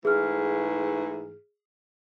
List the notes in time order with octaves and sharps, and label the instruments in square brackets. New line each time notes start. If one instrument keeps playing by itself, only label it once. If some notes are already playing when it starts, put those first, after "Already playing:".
[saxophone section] G#2 E3 A3 [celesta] G#4 F6